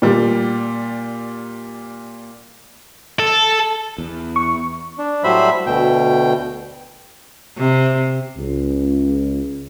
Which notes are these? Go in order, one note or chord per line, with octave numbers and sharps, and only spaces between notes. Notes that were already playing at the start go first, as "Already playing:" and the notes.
A#2 G3
A4
E2
C#6
D4
A2 F#3 G3 C5 E5 B5
D2 B2 G5
C3
C#2